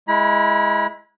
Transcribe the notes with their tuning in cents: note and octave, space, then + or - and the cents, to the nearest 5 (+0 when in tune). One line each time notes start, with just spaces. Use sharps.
G#3 +0 E4 +0 B5 -45